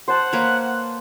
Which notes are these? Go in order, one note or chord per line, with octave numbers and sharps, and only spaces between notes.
C5 F#5 A5
A#3 B4 C#5